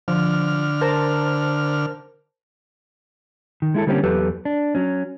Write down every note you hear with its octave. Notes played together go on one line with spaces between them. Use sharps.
D3 F3 F6
A#4 C5 A5
D#3
G#3 E4 A4
D3 G3 A#3 C4 C#4 G4
E2 F#3 G4 A4 B4
D4
F#3 C#4